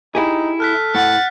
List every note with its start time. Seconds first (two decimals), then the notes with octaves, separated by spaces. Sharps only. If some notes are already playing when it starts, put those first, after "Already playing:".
0.15 D#4 E4 G4 G#4
0.60 A4 F6 F#6 B6
0.95 A2 F#5 A6